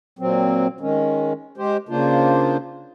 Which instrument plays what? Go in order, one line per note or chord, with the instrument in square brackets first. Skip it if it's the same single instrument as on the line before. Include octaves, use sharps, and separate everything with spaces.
[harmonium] A#2 F#3 C4
D#3 G#3 C#4
G#3 G4 C5
C#3 A#3 D4 F4 C5